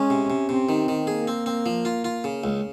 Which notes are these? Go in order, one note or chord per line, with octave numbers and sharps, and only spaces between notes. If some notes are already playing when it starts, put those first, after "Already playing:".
Already playing: G#3 C#4
C3
C3
C3 C4
D#3
D#3
A#3 G#4
C4
C4
F3
F4
F4
C#3
C#2